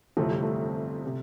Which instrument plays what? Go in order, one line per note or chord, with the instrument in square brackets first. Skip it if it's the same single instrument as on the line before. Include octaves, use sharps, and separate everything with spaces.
[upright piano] G1 F2 C3 E3 [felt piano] A3
[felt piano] G3
A3
[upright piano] C3